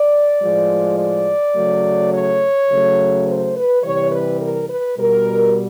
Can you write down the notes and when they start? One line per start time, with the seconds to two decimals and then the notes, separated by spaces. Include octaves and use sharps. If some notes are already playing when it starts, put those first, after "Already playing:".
Already playing: D5
0.42 A2 F3 G#3
0.99 D5
1.56 C#3 F#3 A3
2.13 C#5
2.70 C#3 F#3 A3
3.27 C5
3.56 B4
3.83 C3 E3 G3 C#5
4.12 B4
4.41 A#4
4.69 B4
4.98 B2 G3 A#4